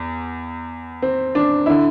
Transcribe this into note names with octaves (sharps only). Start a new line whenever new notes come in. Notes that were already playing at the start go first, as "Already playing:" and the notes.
Already playing: E2
C4
D4
D3 E4